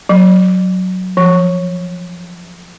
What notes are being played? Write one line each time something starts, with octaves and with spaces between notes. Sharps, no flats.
F#3
F3